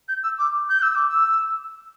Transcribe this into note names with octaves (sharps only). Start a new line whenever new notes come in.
G6
E6
D6
G6
E6
D6
E6